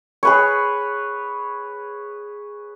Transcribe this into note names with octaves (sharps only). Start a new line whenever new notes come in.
G#4 B4 C#5